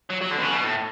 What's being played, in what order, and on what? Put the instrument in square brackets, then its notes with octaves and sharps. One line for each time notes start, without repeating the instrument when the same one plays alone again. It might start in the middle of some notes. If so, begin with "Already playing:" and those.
[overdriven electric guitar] F#3
F#3
D3
B2
C#3
B2
A2